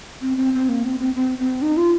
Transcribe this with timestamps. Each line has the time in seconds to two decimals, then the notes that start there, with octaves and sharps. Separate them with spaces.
0.21 C4
0.37 C4
0.53 C4
0.69 A#3
0.84 C4
0.99 C4
1.14 C4
1.38 C4
1.62 D#4
1.77 F4